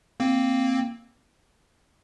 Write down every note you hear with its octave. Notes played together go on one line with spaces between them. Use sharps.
A#3 C4